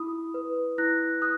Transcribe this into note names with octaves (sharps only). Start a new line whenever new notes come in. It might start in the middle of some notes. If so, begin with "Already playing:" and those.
Already playing: E4 B5 D#6
B4
E4 F#6 A#6
D#6 F#6